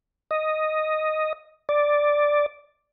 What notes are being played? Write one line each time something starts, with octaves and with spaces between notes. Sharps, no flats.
D#5
D5